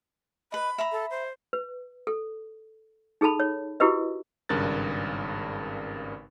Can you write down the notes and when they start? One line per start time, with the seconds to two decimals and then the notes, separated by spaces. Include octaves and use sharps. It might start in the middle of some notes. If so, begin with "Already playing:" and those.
0.52 B4 D#5 B5
0.78 E5 A#5 B5
0.92 A4
1.11 C5
1.53 B4
2.07 A4
3.21 D#4 G#4 A4 A5 B5
3.40 C#5
3.80 E4 F#4 G4 A#4 B4 D#5
4.49 G#1 G2 C#3 A#4 F#6 A6